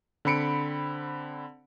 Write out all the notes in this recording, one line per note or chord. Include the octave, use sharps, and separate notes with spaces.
D3 C4 B5 C#7 D7